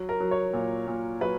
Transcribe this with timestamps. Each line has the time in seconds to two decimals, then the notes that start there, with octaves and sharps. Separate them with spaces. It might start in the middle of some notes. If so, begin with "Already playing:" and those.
Already playing: F#3
0.09 A#4
0.20 F#3
0.31 C#5
0.53 A#2
0.88 A#2
1.21 F#3 B4